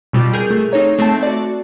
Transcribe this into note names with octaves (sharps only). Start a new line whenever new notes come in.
B2 G3 C4 F4
G#4 A#4 G6
A3 A4
C4 D#4 A4 C#5 A#5
A3 C4 A4 A5
F#4 D5